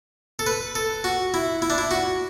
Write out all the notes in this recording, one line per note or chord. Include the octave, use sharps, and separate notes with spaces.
A4
B4
A4
F#4
E4
E4
D4
E4
F#4